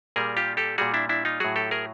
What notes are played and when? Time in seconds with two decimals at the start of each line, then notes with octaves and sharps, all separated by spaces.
0.16 A#2 G3 G#4 A#4
0.37 F4 G4
0.57 G4 A4
0.78 A#2 G3 F#4 G#4
0.94 D4 E4
1.09 D4 E4
1.25 D#4 F4
1.40 A2 F#3 F#4 G#4
1.56 G4 A4
1.71 G#4 A#4